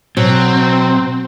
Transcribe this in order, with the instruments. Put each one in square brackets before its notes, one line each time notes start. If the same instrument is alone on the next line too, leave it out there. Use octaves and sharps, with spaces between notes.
[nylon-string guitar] B2 F#3 [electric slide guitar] C4